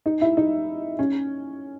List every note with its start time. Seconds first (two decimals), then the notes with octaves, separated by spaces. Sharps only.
0.06 D#4
0.21 E4
0.37 D#4
0.99 C#4